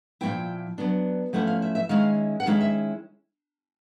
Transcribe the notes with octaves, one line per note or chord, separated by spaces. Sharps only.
A#2 F3 A3 C#4 E4 G5
F#3 B3 D4
F3 A3 C#4 E4 F#5
F5
E5
E5
D#3 G#3 C#4 E4 F5
F#5
D#3 G#3 C#4 E4 F5
E5